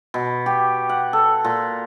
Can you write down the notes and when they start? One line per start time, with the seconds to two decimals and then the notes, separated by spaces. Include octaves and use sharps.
0.14 B2
0.46 G4
0.89 F#5
1.13 A4
1.44 A#2